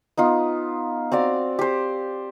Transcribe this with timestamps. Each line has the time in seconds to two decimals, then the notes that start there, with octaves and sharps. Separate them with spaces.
0.17 B3 D#4 F4
1.12 C4 F#4 D5 F5
1.59 G4 C5